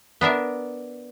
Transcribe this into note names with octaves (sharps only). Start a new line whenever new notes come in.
B3 D4 A#4 E5